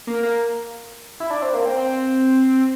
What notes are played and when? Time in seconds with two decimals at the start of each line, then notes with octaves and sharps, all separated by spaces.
0.07 A#3
0.23 A#3
1.20 E4
1.30 D4
1.42 C4
1.54 A#3
1.65 C4
1.77 C4